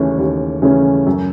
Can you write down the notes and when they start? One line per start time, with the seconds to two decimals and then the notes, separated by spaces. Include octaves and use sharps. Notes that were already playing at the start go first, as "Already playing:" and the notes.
Already playing: D#2 C#3 E3 A3 C#4
0.18 D#2
0.62 C#3 E3 A3 C#4
1.06 F#2